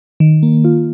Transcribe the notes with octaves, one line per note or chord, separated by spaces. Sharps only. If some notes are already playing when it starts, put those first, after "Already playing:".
D#3
A#3
F4